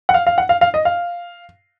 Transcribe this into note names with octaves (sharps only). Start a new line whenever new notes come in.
F#5
F5
F5
F#5
F5
F5
D#5
F5